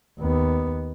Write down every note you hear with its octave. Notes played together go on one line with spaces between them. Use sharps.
D#2 B3